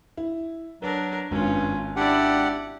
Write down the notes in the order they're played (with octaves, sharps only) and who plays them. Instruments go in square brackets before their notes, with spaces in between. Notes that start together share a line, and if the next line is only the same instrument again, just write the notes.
[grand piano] E4
[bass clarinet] F#3 [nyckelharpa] D4 A#4 [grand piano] B4
[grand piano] G#1 [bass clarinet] G2 [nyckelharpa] C#4 F4
[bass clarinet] D4 [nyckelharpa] E4 D5 [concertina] G4 F#5